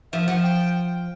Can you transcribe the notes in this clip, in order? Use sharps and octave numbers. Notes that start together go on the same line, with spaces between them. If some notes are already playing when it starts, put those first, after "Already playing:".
F3 E5
F3 F#5
G5